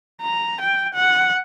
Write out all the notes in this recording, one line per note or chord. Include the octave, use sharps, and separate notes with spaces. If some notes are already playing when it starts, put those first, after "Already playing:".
A#5
G5
F#5